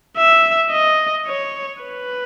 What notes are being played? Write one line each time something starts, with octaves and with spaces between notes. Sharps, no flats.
E5
D#5
C#5
B4